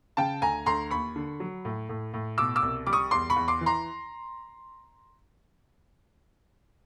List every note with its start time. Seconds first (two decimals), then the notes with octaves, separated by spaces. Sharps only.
0.17 C#3 G5 A5
0.42 D2 G#5 A#5
0.66 D2 A#5 C6
0.91 D#2 B5 C#6
1.16 D3
1.40 F#3
1.65 A2
1.89 A2
2.14 A2
2.38 B2 D6 E6
2.56 D6 E6
2.62 C2
2.86 G3 D6
2.93 C#6 D#6
3.11 E2 C6 D6
3.30 B5 C#6
3.36 E2
3.48 C6 D6
3.61 E3
3.66 A#5 C6